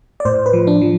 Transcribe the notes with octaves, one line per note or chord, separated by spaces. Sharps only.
D5
A2 C5
B4
F3
D4
F3